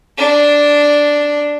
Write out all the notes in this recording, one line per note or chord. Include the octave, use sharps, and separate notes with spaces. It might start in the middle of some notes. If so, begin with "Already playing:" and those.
D4